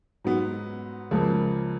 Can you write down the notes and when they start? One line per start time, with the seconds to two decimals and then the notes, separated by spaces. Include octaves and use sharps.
0.25 G#2 F#3 B3
1.11 C#2 C#3 F3 A#3